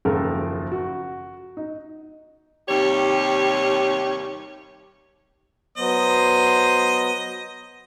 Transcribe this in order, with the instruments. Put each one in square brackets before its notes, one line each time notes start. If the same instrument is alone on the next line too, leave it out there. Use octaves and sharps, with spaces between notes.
[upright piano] F#1 D#2 F3 F4 A4 A#4
F#4
D#4
[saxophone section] D#2 C3 G3 G4 C#5
[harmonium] F#3 B3 [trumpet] C5 [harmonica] D#5